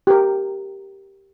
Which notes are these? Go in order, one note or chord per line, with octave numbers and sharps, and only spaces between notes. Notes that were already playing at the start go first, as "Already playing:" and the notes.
G4 A#4